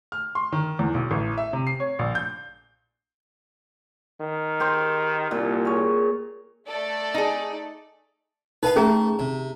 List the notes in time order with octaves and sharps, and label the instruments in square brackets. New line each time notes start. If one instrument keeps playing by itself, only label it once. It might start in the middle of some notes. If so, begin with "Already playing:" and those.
[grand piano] F6
C6
D#3
E2
B1
A1
E5
C3
C7
C#5
A#1
G6
[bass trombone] D#3
[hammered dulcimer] G4 A#4 C5
[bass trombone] C2 [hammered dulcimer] A#2
[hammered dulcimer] G#4 C#5
[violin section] A3 A4 D5
[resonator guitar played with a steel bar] D#4 G#4
[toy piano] D#4 A5 [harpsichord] B4 D#5 F5
[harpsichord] A3 [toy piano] C#4 G#4 A#5
[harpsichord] C3